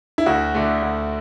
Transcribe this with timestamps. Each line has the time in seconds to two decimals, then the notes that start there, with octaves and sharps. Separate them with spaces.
0.18 E4
0.26 D2 F#4
0.55 D3 A3
0.82 D2